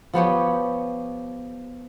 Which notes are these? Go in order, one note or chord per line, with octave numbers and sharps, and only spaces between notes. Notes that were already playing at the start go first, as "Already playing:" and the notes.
F3 B3 G4 C#5